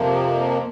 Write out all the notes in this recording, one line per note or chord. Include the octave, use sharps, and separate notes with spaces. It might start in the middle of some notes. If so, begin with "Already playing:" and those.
Already playing: F2 C3 F3 A#3